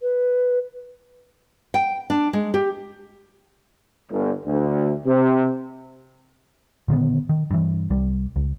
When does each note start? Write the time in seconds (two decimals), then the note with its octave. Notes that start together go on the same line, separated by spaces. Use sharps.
0.01 B4
1.74 G5
2.10 D4
2.33 G#3
2.54 G4
4.10 G1
4.45 D2
5.06 C3
6.88 A#2 D3 D#3 B3
7.29 D#3
7.51 G2 E3
7.90 C2 G3
8.36 C#2